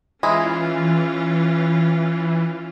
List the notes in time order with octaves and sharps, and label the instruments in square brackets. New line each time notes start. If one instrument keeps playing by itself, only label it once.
[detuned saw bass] E3 [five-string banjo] G#3 E4 [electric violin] C#4 F4